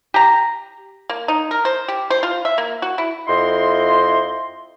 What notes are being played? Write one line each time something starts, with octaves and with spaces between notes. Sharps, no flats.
G4 A#5
A#3
D#4
A#4
C5
G4
C5
F4
E5
A#3
F#4
E4
F2 E4 D#5 C6